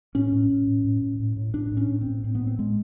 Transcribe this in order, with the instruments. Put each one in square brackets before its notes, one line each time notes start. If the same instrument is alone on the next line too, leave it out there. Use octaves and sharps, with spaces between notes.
[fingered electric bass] A2 C#4
A2
A2
A2
A2
A2
A2
A2
A2 D4
A2
C#4
A2
C4
A2
A2 C4
B3
A2
C4
A2 G#3